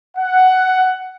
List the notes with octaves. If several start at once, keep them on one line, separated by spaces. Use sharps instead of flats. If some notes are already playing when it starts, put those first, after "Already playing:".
F#5